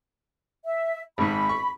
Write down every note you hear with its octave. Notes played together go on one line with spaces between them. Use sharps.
E5
G#1 G#2 B5
C#6